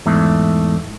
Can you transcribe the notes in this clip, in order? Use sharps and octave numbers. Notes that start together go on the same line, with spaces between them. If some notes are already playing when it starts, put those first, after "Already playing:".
E2 G#2 A3